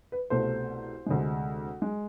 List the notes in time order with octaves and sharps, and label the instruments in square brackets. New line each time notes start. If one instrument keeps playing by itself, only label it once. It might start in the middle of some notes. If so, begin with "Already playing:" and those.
[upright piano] B4
C2 B2 A3 C5
D2 C3 G#3
G#3